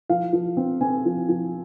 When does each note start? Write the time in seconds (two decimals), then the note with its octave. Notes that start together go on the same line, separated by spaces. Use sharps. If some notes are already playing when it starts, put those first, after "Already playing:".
0.09 F3 F5
0.33 F3
0.57 C4
0.81 C4 G#5
1.05 F3
1.29 F3